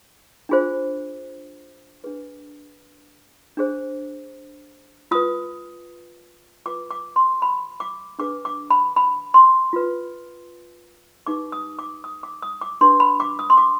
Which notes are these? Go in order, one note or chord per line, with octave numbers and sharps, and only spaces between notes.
D4 F4 G#4 C5
D4 G#4 B4
D4 G#4 C5
F4 B4 D#6
F4 B4 D6
D6
C6
B5
D6
D4 G#4 B4 D6
D6
B5
B5
C6
F4 B4
D#4 G4 B4 D6
D#6
D6
D#6
D6
D#6
D6
D4 G4 B4 C6
B5
D6
D#6
C6
D6